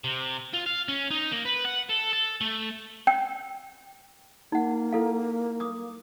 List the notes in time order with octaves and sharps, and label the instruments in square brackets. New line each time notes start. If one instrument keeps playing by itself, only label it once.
[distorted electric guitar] C3
F4
F5
C#4
D#4
A#3
B4
F#5
A4
A4
A3
[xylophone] G5
[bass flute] A#3 [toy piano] D#4 F#5
[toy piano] E4 A4 F5
D6 D#6